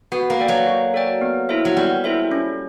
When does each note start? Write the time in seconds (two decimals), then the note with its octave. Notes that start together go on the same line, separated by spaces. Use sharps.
0.12 B3 F#4
0.30 A#3
0.39 A4 D5 G5
0.48 F#3
0.66 F#4
0.94 A4 D5 G5
1.21 B3
1.49 E4 A4 C5 E5
1.65 F#3
1.76 G3 B3
2.04 E4 A4 C5 E5
2.31 C#4